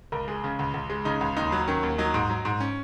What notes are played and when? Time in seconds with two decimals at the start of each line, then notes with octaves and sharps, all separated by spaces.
0.12 C#2 A#4
0.28 G#3 G#4
0.44 C#3
0.59 C#2
0.74 C#2
0.90 G#3
1.05 C#3 D#4
1.21 C#2
1.36 D#2 D#4
1.52 F#3
1.68 D#3 C#4
1.83 D#2
1.98 F#3 D#4
2.14 G#2
2.30 F#3
2.45 G#2
2.60 C#4